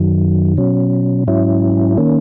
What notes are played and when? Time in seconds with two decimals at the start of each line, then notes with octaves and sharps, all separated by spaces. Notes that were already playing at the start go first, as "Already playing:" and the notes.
Already playing: F#2 D#3 F#3
0.57 B2 F#3 C#4
1.27 G#2 F#3 C#4 E4
1.98 D#3 A#3 C#4